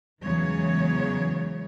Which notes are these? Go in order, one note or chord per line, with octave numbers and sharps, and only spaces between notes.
E2 C#3 E3 F#3 G#3 C#5